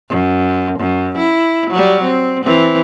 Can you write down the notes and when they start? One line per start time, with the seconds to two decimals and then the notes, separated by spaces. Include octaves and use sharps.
0.10 F#2
0.79 F#2
1.18 E4
1.71 F#3 G3
2.03 C4
2.44 E3 C4